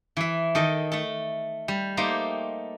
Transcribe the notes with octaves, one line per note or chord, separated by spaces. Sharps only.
E3 E5
D#3 A4 D#5
A3 A4
G3
A3 A#3 D#4 G4 C5